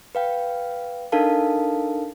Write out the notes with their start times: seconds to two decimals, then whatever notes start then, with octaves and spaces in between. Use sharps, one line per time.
0.15 B4 F5 G5
1.12 D4 D#4 A4 A#4 F5 A5